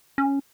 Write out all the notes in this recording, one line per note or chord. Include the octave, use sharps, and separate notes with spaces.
C#4